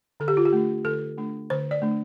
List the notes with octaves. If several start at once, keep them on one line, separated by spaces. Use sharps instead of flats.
D3 A4
G4
F4
G4
A3 D4
D3 A4
A3 D4
D3 C5
D5
A3 D4